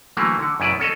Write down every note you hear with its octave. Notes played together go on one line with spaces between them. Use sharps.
D3 E3 F#3 A3 A#3
D3 F#5
F#2 C#3 E4 B4 D5
C#4 A4 C#5 D#5